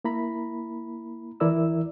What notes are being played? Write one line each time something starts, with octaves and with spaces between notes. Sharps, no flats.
A#3 E4 A#5 B5
D#2 E3 E4 A#4 D5 E6